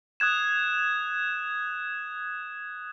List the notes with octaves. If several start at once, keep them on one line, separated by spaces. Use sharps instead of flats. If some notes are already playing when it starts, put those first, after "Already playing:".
D#6 F#6 G#6 E7